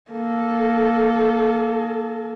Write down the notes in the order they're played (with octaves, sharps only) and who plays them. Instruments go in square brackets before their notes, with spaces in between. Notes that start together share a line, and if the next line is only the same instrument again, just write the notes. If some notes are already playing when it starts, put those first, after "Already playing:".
[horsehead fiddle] A#3 A4